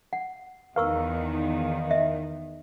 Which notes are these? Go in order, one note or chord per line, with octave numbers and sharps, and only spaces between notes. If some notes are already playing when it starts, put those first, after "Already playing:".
F#5
E2 D#3 A#4 B4 F5 C#6 E6
D#5 E5